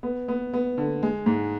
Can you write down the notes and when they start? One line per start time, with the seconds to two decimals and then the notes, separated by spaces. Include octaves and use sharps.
0.03 B3
0.28 B3
0.53 B3
0.78 D3
1.03 G#3
1.26 G#2